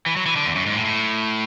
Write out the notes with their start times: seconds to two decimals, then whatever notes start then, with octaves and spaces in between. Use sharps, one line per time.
0.06 E3
0.16 F#3
0.26 E3
0.36 D3
0.46 E2
0.55 F#2
0.66 G#2
0.75 A2
0.85 A2